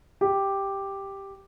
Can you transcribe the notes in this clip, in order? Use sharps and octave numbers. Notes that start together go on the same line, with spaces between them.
G4